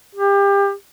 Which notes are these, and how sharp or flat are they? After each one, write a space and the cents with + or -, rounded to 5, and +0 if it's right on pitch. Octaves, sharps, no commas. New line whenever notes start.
G4 +30